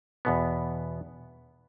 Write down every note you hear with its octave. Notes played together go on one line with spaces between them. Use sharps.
E2 B2 B3